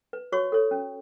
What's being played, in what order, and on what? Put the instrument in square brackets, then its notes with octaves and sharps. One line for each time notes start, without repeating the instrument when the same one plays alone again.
[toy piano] B4
F#4 C#5 C#6
A4 C#5
C#4